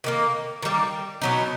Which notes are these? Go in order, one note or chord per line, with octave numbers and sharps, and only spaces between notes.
D#3 G3 A#3
D#3 G3 A#3
B2 F#3 B3 D#4